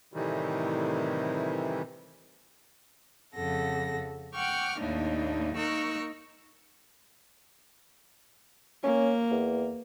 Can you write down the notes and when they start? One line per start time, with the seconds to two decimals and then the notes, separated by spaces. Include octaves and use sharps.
0.14 A2 C3 D#3 E3 G3
3.35 F2 C#3 A4 F#5 A#6
4.34 F#5 G5 C#6 D6 F6
4.79 D#2 A2 A#3 D4 D#4
5.54 A#3 D#4 A#4 C#6 E6 F#6
8.84 A#3 C#4
9.31 E2